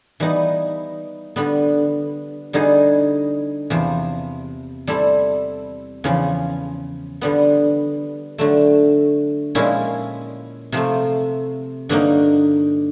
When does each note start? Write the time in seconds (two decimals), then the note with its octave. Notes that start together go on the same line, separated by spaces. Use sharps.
0.20 E3 G3 B3 D#4
1.36 D3 G3 B3
2.53 D3 G3 B3 D#4 G#4
3.70 E2 C3 F3
4.87 G3 C4 E4 A4
6.04 E2 C#3 F3
7.21 D3 G3 B3
8.38 D3 F#3 A3
9.55 A#2 F3 G#3 C#4 E4
10.72 C3 F3 A3
11.89 G2 D3 F#3 A#3 D#4